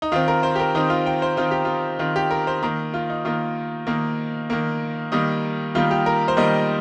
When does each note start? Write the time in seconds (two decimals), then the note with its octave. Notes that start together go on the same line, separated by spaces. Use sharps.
0.02 D#4
0.12 D#3 C4 F4
0.28 A#4
0.43 C5
0.55 G4
0.60 A#4
0.75 D#3 C4 D#4
0.90 F4
1.06 G5
1.22 C5
1.37 D#3 C4 F4
1.51 G4
1.65 F4
1.99 D#3 C4 F4
2.16 G4
2.31 A#4
2.47 C5
2.63 D#3 A#3 A#5
2.94 F4
3.10 D#4
3.25 D#3 A#3 F4
3.87 D#3 A#3
4.50 D#3 A#3
5.12 D#3 G3 A#3 D#4
5.75 D#3 G3 A#3 F4
5.91 G4
6.06 A#4
6.28 C5
6.37 D#3 G3 A#3 D#5